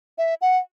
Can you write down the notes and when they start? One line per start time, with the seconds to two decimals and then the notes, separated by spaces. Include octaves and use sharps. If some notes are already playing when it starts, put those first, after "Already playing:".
0.18 E5
0.41 F#5